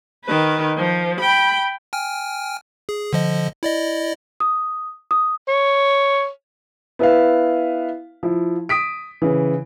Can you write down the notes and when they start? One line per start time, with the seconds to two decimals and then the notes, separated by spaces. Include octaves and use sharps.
0.25 D#3 B4
0.77 F3
1.20 G5 B5
1.93 G5 G#5 F6
2.89 G#4
3.13 D3 F3 D#5
3.63 E4 D5 D#5
4.40 D#6
5.11 D#6
5.48 C#5
6.99 B3 E4 B4 E5 F5
8.23 F3 E4
8.69 D#6 B6 D7
9.22 C#3 E3